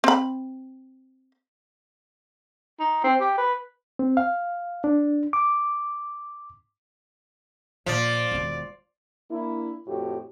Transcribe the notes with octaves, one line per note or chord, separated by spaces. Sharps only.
C4 B5
D#4
C4
G4
B4
C4
F5
D4
D6
A#2 F3 D5
E1 D#3
A#3 D4 E4
F2 A2 F#4 G4